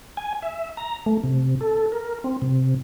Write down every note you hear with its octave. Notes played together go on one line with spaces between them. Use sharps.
G#5
E5
A#5
A3
C3
A4
A#4
C4
C3